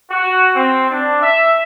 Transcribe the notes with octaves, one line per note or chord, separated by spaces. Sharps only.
F#4
C4
D4
E5